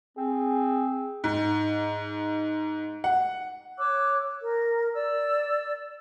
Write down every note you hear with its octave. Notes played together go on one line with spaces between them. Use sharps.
C4 G#4
G#2
F#5
C#5 D6 E6 F#6
A#4
D5 E6